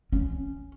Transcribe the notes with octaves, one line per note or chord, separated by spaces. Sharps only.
C#4